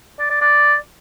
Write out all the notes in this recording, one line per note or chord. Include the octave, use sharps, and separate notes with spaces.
D5
D5
D5